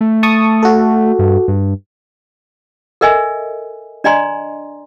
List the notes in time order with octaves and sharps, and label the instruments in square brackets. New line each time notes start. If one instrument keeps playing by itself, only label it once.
[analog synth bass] A3
[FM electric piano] A5 C#6 D#6
F#4 A4
[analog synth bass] G2
G2
[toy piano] A4 A#4 D#5 E5 G#5
D4 D5 D#5 G#5 A#5 C6